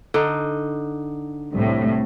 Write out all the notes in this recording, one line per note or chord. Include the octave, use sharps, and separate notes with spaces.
D3 D#4
C2 A2